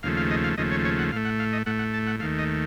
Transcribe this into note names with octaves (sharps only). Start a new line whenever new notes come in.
D#2 C#3 F3 A3 F5
F5
D#5
F5
D#2 C#3 F3 A3 D#5
C#5
C#5
F#5
A2 A3 F5
F#5
F5
D#5
A2 A3 F#5
F#5
A5
F#5
D#2 D#3 A3 F5
D#5